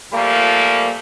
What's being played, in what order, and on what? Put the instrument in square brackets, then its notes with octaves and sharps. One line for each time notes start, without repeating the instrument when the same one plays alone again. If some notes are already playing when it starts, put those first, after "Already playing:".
[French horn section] A#2 F3 G3 A3 A#3